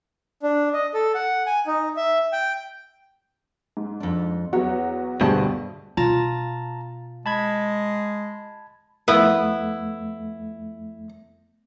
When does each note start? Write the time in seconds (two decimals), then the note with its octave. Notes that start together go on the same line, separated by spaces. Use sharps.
0.43 D4
0.73 D#5
0.94 A4
1.15 F#5
1.46 G#5
1.67 D#4
1.97 E5
2.33 G5
3.77 G#2
4.00 F2 D4
4.53 E2 F#3 F#4 C#5
5.21 D2 G2 B2 D4 G4 G#4 C5 A5
5.97 B2 F4 A5 A#5 A6
7.26 G#3 A5 B5 G#6
9.08 F2 A3 B3 E4